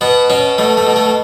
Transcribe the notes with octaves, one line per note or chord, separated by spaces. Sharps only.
B2 B3
B2 C#4
B2 A3
A3
B2
A3